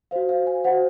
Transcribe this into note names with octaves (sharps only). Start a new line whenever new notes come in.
F#4 C5 F5
F5
G#5
F#4 C5 F#5